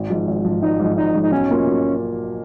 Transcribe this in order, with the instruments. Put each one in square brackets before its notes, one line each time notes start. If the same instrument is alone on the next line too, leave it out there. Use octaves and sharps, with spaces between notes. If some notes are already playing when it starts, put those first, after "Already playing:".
Already playing: [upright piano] G#1
G#2 F3
G#1
G#2 F3
[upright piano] G#1 [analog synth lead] D#4
[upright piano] G#2 F3
[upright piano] G#1 [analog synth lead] D#4
[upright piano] G#2 F3
[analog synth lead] D#4
[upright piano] B1 [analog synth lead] C#4
[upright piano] B2 A#3 F4
B1